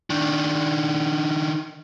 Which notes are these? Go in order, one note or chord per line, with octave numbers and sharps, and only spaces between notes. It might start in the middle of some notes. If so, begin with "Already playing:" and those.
D#3 D4